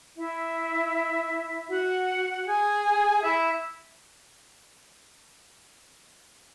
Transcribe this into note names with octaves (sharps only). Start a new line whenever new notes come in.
E4 E5
F#4 F#5
G#4 G#5
E4 E5